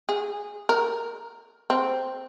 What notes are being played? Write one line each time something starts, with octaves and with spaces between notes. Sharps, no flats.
G#4
A#4
C4